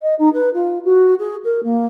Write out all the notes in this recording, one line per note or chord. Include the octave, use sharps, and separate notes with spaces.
D#5
D#4
B4
F4
F#4
G#4
A#4
A#3